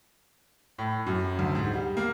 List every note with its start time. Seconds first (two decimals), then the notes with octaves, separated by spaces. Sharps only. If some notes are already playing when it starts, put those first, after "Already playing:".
0.78 A2
1.06 F#2
1.39 D2
1.55 G#2
1.73 G3
1.97 A#3